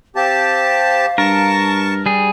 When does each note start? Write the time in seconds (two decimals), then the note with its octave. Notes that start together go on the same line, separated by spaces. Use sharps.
0.16 C4 G4 F5 A5
1.18 G2 A#4 A5 C#6
2.06 G3 G#4